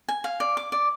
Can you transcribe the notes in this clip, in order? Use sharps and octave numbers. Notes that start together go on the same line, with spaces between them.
G#5
F5
D5
D6
D5